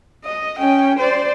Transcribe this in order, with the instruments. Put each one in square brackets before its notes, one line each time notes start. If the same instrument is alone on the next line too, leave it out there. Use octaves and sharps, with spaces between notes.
[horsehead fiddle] D#5
C#4 G5
C5 D5